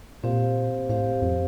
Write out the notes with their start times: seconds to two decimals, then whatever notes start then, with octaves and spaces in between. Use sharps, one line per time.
0.23 A#2 C4 G4 C5 F5
0.89 A2 C4 G4 C5 F5
1.22 F2